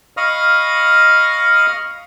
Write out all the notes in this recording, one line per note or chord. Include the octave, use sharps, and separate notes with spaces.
D#5 F5 B5 C#6 D#6 F6